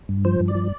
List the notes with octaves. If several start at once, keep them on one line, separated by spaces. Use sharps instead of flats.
G2
F3 C5
G2
D5
F3